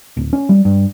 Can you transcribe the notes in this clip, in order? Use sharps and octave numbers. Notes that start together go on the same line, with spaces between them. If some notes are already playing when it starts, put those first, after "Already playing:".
D1
C#4
G3
G2